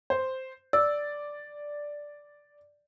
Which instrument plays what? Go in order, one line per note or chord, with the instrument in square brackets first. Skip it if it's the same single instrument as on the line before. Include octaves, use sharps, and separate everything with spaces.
[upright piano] C5
[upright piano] D5 [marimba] E6